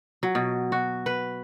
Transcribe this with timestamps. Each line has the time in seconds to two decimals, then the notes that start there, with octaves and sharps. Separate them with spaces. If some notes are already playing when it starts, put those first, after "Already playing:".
0.23 F#3
0.35 B2
0.72 F#4
1.06 B4